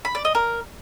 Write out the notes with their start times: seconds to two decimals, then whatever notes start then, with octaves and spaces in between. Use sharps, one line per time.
0.05 B5
0.15 D5
0.25 D#5
0.35 A#4